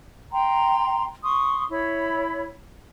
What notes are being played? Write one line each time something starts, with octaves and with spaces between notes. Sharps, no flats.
G5 A#5 C6
C6 C#6 D#6
E4 C#5 B5